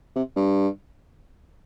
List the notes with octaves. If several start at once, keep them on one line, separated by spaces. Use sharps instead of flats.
C3
G2